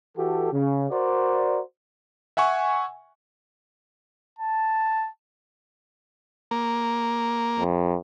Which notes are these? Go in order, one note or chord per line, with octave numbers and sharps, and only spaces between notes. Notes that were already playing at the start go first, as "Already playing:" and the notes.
E3 F#4 G4 A4
C#3
F#4 A#4 C5 D5
E5 F#5 G#5 C#6
A5
A#3
F2